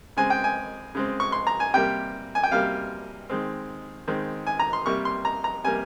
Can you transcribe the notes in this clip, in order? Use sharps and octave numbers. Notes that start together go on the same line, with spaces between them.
C#3 G#3 C4 G#5
G5
G#5
C#3 G#3 C4
C#6
C6
A#5
G#5
C3 G3 A#3 G5
G#5
G5
C3 G3 A#3 F5
D#3 G#3 C4
D#3 G#3 C4
G#5
A#5
C6
C3 G3 A#3 C#6
C6
A#5
A#5
C3 G3 A#3 G#5